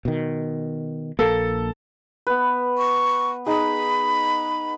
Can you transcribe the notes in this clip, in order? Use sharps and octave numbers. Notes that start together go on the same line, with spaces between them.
B2 D#3
A#1 A#3 A4
B3 B4
C#6
D#4 G#4 B5